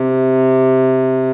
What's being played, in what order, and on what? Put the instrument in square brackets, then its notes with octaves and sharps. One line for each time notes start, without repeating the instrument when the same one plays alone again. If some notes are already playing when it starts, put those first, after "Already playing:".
Already playing: [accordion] C3